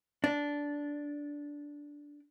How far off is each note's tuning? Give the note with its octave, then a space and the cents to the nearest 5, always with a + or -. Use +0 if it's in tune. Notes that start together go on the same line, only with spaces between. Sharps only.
D4 -10